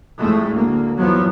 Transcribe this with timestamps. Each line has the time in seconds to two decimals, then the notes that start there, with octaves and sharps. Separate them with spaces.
0.18 F2 A2 G#3 A3
0.50 D2 A#3
0.97 E2 F3 F#3 B3